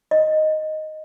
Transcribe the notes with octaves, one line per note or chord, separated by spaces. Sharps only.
D#5